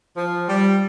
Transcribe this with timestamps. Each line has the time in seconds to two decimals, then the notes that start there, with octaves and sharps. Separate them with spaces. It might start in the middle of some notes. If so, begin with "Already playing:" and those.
0.17 F3
0.49 G3